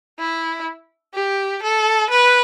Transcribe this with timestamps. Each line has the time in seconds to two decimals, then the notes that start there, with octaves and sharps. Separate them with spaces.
0.19 E4
1.15 G4
1.63 A4
2.10 B4